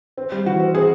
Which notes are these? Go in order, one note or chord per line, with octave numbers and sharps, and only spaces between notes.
C4
G3
E3 F#4
C4
C4 G#4